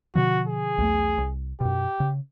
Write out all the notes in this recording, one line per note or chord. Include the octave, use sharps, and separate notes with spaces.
B2 D3 F3 F#4
G#4
B1 E2 A3
C2
F#2 B2 G4
C#3